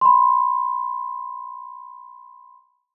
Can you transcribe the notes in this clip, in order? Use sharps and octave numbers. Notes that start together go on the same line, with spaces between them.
B5 C6